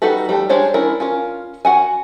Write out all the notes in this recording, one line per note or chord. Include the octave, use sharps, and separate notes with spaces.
G3 D#4 F#4 A4 B4
G3 A3 A5
G3 G#3 D4 C5 C#5
C#4 D4 E4 A#4
C#4 F4 A#4
F#4 F#5 G#5